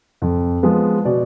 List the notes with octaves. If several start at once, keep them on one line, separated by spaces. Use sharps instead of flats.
F2
F3 G#3 B3
B2 D5